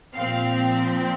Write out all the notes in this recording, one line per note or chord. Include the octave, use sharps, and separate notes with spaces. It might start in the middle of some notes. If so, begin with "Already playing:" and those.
A#2 F3 C4 F5